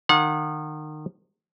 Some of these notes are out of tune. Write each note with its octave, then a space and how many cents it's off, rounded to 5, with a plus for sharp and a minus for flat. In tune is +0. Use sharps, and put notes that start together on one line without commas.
D#3 -30 F#5 -35